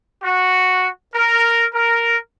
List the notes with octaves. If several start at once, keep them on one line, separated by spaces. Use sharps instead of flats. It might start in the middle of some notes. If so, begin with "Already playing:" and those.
F#4
A#4
A#4